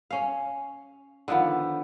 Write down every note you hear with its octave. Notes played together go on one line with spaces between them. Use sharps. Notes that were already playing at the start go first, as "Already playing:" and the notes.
C#4 F5
D3 D#3 F3 B3